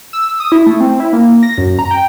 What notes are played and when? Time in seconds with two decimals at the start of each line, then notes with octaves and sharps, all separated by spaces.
0.13 E6
0.40 D#6
0.52 E4
0.66 A3
0.80 C4
1.00 E4
1.13 A#3
1.43 A#6
1.58 F#2
1.79 A#5
1.91 G5